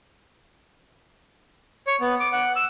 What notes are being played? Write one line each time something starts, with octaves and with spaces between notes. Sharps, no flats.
C#5
B3
D6
F#5
E6